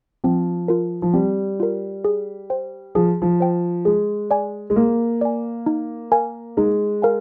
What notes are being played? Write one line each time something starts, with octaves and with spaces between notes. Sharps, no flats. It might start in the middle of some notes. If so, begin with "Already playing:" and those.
F3 C4
F4 A#4
F3
G3 C4
F4 A#4
G#4
C5 G5
F3 G#4
F3
C5 G5
G#3 G#4
D5 G#5
G#3
A#3 G#4
D5 G#5
D#4
A#4 F5 G#5
G#3 D#4
A#4 F5 G#5